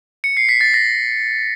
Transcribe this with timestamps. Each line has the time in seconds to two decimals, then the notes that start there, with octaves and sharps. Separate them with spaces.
0.24 C#7
0.37 C7
0.49 B6
0.61 A6
0.74 A#6